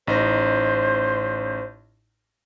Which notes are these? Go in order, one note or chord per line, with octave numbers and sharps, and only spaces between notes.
A1 D#4 C5 A#6